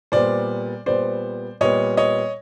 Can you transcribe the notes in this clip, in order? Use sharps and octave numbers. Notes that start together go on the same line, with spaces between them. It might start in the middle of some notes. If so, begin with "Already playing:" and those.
A#2 G3 B3 C5 D5
A#2 G3 B3 C5 D5
A#2 G3 B3 C#5 D#5
C#5 D#5